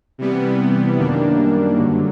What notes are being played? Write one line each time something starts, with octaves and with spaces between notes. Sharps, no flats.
C3 E3 G3 B3
F#2 D#3 G3 A#3 D4
G2 D3 F#3